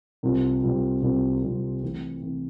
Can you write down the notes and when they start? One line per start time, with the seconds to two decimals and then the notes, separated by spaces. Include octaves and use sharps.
0.23 C2 C3 G3 C4 F4
0.63 C2 C3 G3 C4 F4
1.02 C2 C3 G3 C4 F4
1.43 C2 C3 G3 C4 F4
1.83 C3 E3 A3
2.22 C3 E3 A3